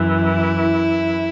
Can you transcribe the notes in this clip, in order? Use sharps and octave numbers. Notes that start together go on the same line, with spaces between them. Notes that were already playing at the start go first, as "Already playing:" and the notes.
Already playing: F#2 E3
E4